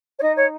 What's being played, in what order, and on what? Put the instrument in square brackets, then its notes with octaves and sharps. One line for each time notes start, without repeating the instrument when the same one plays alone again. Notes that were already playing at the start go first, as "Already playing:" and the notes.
[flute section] C#5
D#4 D#5
C#5